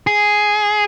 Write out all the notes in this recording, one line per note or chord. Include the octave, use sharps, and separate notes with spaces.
G#4